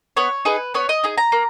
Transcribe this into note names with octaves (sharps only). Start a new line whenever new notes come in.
B3 C#5
D#4 G#4 B4
B3 C#5
D#5
D#4 G#4
A#5
A#3